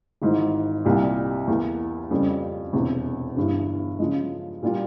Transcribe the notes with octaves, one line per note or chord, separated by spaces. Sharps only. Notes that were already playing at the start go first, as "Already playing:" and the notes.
G#1 G#2 E3
C2 A#2 G3
E2 E3 A#3
F2 C#3 G3
E1 E2 C3
G1 G2 E3
C#3 F3 G#3
A#2 G3 A#3 F4